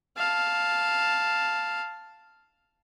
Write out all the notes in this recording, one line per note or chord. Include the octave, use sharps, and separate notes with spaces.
F5 A5